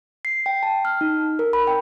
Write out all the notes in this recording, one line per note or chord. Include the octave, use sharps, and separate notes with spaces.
C7
G5
A5
F6
D#4
A#4
B5
G5